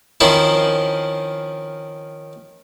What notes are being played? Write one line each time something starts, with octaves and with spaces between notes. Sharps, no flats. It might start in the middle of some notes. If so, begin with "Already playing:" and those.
D#3 F3 C4 C#4 E4